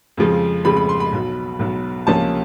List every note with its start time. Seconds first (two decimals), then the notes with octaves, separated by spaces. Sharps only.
0.17 F2 C#3 F3 G#3
0.65 F2 C#3 F3 G#3 B5
0.77 B5
0.89 C6
1.00 B5
1.12 B1 B2 F#3
1.59 B1 B2 F#3
2.07 C#2 C3 F3 A#3 C#4 A5